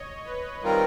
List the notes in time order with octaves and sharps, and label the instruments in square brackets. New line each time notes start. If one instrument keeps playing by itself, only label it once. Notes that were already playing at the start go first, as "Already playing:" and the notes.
Already playing: [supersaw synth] C#5 D#5
B4 C#5
[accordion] D#3 G3 C4 F4 A#4